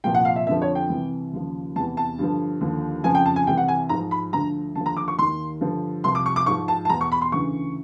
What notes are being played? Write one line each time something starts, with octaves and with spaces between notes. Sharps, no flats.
C2 A#2 F3 G5
F#5
F5
E5
F2 D3 F3 E5
C#5
G5
C2 C3 E3
D#2 C#3 F3
E2 C3 E3 A5
A5
G2 D3 F3
D#2 D3 F3
F2 C#3 F3 G#5
G5
A5
G#5
C2 C3 E3 G5
F#5
G#5
G#2 F3 A#5
B5
D2 D3 F3 A#5
D#2 D3 F3 A5
A#5
D6
C#6
D#2 D#3 C6
G2 D3 F3
C2 C3 F3 C6
D6
C#6
D6
G#2 F3 C#6
A5
A5
E2 B2 A#5
C#6
B5
C6
D2 C#3 E3 C#6